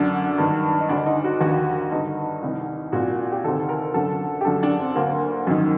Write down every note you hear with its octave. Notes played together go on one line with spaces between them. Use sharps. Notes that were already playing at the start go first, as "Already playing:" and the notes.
Already playing: F#2 D3 D4
G2 D#3
D#4
D2 D3 D4
D#4
F#4
D#2 D3 F#4
G2 D3 D#4
C2 C3 D#3
C2 A#2 F#4
G4
D2 C3 D#3 A4
A#4
F#2 D3 A4
G4
F#2 D3 A4
D4
C4
D2 D3 A#3
F#2 D#3